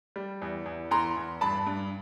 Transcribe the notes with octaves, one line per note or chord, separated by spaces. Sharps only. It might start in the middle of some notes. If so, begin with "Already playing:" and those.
G3
E2
E2
E2 A#5 C6
E2
G2 A5 B5
G2